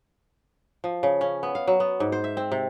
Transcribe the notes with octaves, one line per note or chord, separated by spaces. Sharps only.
F3
C#3
C#4
B3
F5
F#3
B3
G#2
C5
E5
C4
C3